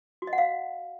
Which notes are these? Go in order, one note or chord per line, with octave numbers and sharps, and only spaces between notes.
F#4
D#5
F#5
F5